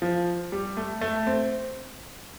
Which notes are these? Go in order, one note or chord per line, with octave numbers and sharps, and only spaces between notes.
F3
G3
A3
A3
C4